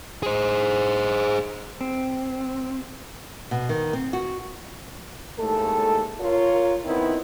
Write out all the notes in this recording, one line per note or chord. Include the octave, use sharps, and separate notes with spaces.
G#4 C5
C4
B2
D#3
C4
F#4
D#2 A2 G#3 A3 A4
F4 A#4 C#5
D#3 B3 C4 E4 B4 D#5